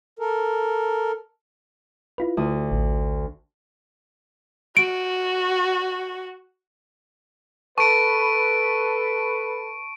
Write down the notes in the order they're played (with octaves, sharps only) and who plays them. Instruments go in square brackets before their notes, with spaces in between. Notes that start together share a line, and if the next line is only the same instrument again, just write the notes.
[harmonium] A4 A#4
[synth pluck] E4 F4 B4
[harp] D2 D#6
[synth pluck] A1
[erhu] F#4 [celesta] D7
[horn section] A4 B4 [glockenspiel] A5 [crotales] C#6 D7